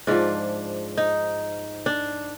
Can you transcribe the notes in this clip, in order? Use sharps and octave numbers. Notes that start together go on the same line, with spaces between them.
G#2 F3 D4
D#4
D4